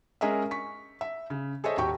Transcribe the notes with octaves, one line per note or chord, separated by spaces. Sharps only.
G#3 C#4 G#4 A#4 D#5 E5
C#6 B6
E5
C#3
G#4 A4 C5 C#5 D#5 E5
D#1 D#2 F#4 G4 G5 C#6